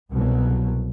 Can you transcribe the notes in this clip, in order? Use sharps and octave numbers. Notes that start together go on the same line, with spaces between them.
C2 B2 F#3